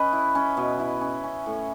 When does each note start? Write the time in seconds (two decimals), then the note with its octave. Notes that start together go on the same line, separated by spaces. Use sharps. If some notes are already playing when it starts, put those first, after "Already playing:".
Already playing: C#4 B4 D#5
0.13 E4
0.35 C#4
0.57 B2
0.80 E4
1.01 C#4
1.24 C#4
1.46 A2